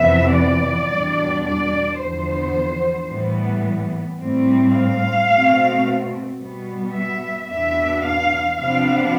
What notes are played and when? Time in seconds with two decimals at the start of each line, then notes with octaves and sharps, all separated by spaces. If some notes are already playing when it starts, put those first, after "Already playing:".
Already playing: F2 C3 E3 B3 E5
0.33 D5
0.89 E2 B2 G3 D4
1.44 D5
1.98 E2 D3 F3 B3 C5
3.08 A2 E3 G3 B3
4.18 A2 G3 C4
4.73 F5
5.28 B2 A3 C4
6.38 B2 G3 B3
6.92 E5
7.48 E2 B2 B3 D4 E5
8.03 F5
8.57 C3 F3 B3 D4 F5